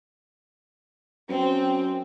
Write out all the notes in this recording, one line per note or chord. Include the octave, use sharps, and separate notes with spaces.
F#2 C4